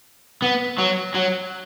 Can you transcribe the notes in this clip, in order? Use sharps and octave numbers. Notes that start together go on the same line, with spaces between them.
B3
F#3
F#3